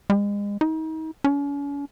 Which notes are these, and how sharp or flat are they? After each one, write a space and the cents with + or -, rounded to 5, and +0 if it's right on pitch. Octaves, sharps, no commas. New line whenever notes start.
G#3 -35
D#4 +35
C#4 +40